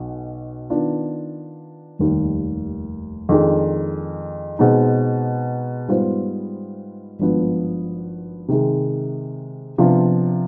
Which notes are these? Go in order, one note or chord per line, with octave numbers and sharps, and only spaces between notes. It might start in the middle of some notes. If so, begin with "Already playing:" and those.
Already playing: B1 B2
D#3 B3 D4 F4
F1 D#2 D#3 G3
F2 D#3 G#3 D4
B2 G#3 C4 D#4
G#2 G3 B3 F4 C5
G#1 G2 F3 B3
C3 D#3 G#3
C3 F3 B3 D4 F4